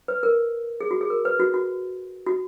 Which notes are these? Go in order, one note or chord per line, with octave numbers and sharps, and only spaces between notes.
B4
A#4
G#4
F#4
G#4
A#4
B4
F#4
F#4
F#4